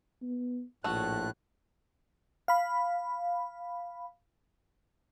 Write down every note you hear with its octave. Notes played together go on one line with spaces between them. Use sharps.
B3
A#1 A2 A3 F4 F#4 F#6
F5 B5